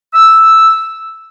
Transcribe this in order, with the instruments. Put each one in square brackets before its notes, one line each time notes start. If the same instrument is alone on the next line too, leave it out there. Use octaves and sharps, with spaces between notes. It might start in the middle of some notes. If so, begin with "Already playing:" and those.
[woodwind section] E6